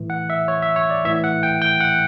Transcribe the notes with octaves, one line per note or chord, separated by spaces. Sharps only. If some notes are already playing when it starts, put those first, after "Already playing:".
Already playing: A2 E3
F#5
E5
C#5
E5
C#5
D5
A2 E3 E5
F#5
G5
G5
F#5